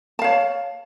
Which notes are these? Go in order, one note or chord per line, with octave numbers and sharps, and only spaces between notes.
C#5 F5 A5